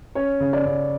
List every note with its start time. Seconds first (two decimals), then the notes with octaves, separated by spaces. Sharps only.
0.15 C#4 C#5
0.40 C#3
0.53 D5
0.65 C#3